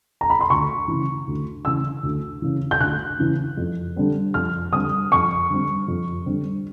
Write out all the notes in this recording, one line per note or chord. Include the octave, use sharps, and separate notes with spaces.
A#5
B5
C6
D2 C#6
C#3 E3
D2
C#3 E3 E6
D2
C#3 E3
G6
D2 F#6
C#3 E3
F2
D3 G3 C4
F2 F6
D3 G3 C4 D#6
F2 C#6
D3 G3 C4
F2
D3 G3 C4